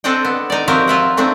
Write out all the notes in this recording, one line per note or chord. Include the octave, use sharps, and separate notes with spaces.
C4 D4 A4 D#5 F#5 G5
B3
D#4 D5
F3 F#3 C4 G4 A#4 E5
F4 E5 F#5
A3 C4 D4 D#4